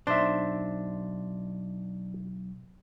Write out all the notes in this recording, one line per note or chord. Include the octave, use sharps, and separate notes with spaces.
B1 D4 C5 E5